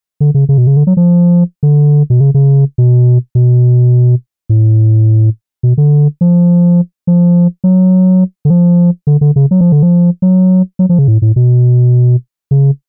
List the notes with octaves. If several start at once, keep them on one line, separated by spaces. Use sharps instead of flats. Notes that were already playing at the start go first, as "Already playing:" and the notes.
D3
C#3
C#3
B2
C#3
D3
F#3
F3
D3
B2
C#3
C#3
B2
B2
A2
B2
D3
F3
F3
F#3
D3
F3
D3
D3
C#3
F#3
F3
D3
F3
F#3
F#3
F3
C#3
A2
A2
B2
C#3